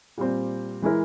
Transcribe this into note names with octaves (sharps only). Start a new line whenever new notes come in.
A#2 G3 C4
E3 G#3 E4 A#4